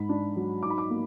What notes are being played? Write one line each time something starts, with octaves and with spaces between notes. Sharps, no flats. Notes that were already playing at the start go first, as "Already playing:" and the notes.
Already playing: G#2 B5
D4
F#3
D#4 D6
B5
D6
A#3